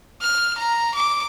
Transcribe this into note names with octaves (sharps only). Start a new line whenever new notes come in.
F6
A#5
D6